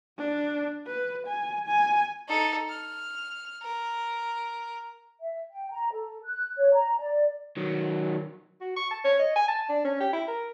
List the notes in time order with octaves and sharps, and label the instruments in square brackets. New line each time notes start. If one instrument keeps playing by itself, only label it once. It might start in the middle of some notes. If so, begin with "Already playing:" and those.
[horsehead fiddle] D4
B4
G#5
G#5
[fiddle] D#4 A4
F6
A#4
[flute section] E5
G5
A#5
A4
F#6
C#5
A#5
D5
[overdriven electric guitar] D#3 F#3
[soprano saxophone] F#4
C#6
A5
C#5
D#5
G#5
A5
D4
C#4
G4
E4
A#4